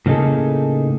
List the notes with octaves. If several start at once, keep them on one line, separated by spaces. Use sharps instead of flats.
A2 C#3 A#3 D#4 G#4 A4